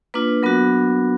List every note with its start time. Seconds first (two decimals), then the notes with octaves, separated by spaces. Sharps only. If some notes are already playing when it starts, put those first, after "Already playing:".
0.14 A#3 D4 F4 B4
0.43 F#3 B3 D4 F#4 A#4